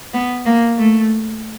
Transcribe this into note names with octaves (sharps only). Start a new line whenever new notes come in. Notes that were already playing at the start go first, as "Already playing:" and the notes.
B3
A#3
A3